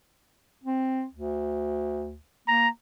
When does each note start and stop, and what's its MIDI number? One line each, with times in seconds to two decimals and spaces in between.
0.63 1.05 60
1.13 2.17 38
2.48 2.68 58
2.48 2.69 82